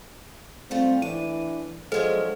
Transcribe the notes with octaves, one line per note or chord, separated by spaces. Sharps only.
G3 A3 C4 F4
E3 D4 D#7
F3 F#3 G#3 D4 A4 C5